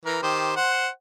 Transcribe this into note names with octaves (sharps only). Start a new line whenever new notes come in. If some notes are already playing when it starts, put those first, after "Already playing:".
E3 A#4
D#3 G4 C5
C5 F#5